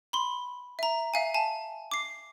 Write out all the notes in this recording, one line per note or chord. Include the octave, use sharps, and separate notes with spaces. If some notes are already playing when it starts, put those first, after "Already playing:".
B5 C6
E5 A#5
E5 F5 G#5
G#5 A5
D6 C7